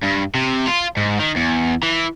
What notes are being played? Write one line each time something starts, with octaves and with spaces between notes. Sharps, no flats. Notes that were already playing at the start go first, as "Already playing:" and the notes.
G2
C3
F4
G#2
D#3
E2
E3